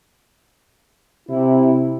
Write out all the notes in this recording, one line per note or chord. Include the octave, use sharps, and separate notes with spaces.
C3 E4